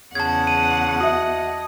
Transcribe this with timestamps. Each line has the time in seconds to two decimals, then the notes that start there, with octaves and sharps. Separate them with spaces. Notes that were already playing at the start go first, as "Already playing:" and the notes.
0.15 E2 C#3 F#5 A5 G#6
0.47 D#7
1.00 F#4 D#5 E5